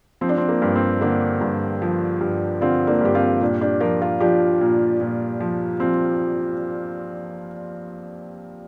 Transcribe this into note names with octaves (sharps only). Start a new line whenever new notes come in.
F3 C4
D4
C4
A#3
G2
C4
D3 A#3 D4
G2
F3
G2
D3 C4 F4
A#3 D4
G2 G4
C4 F4
A#2 D4 G4
D4 G4
F3 F4 A#4
F4 A#4
F3 D4 G4
A#2
A#2
F3
F3 C4